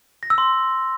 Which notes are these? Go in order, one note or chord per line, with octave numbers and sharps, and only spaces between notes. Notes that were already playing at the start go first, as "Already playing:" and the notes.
A#6
E6
C6